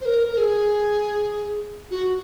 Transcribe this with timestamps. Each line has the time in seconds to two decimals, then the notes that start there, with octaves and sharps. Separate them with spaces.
0.01 C5
0.05 A#4
0.32 A#4
0.37 G#4
1.91 F#4